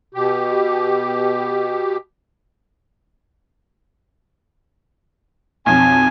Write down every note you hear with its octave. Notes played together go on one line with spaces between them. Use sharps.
B2 G4
B1 F2 C4 G#5